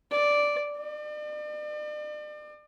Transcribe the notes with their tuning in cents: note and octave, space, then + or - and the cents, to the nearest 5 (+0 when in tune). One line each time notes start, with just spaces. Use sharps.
D5 -5
D5 +40